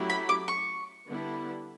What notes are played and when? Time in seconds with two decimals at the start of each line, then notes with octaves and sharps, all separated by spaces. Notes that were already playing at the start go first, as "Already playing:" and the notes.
Already playing: F#3 A3 C#4 E4 G4
0.10 B5
0.29 D6
0.48 C#6
1.07 D3 G3 B3 E4